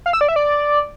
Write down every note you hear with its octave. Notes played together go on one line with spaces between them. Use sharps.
F5
E6
D5
E5
D5